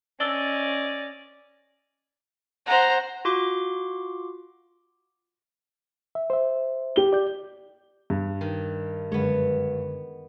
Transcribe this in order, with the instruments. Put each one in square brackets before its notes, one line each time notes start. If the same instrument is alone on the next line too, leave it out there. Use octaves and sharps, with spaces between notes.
[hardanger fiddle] C#4 D#5 [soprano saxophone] D5 [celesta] E6 A6 G7
[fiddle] C5 A#5 [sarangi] F#5
[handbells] F4 F#4 C6 D6
[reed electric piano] E5
C5 E5
[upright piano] G4 G7
[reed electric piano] D5 G6
[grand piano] G2
[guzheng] D#3
[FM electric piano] F#2 D3 G#3 [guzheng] B3 C#5